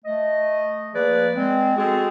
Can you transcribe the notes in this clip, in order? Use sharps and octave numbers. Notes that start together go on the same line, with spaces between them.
A3 D#5
F3 A#3 G#4 B4 D5
G#3 C4
G#3 C4 F#4 G#4 A4